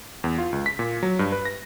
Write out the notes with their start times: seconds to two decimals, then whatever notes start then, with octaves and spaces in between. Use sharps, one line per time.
0.24 E2
0.38 F4
0.52 C#2
0.66 B6
0.79 A#2
1.03 F#3
1.19 G2
1.32 B4
1.45 A#6